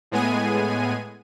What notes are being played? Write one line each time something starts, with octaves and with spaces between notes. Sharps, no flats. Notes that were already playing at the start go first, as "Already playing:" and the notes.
A2 G#3 B3 G#4 G#5 D#7